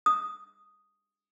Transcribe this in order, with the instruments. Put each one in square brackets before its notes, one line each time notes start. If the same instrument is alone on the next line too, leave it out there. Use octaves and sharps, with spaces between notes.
[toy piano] D#6